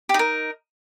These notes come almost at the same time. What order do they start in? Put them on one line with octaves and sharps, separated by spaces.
G4 D#4 A#4